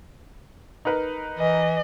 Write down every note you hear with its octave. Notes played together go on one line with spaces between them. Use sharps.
D#4 A#4 B4
E3 D#5